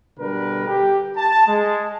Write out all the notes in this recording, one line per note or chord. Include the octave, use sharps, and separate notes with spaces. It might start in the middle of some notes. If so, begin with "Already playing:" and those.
B2 D3 G3 A#4 B4
G4
A5
G#3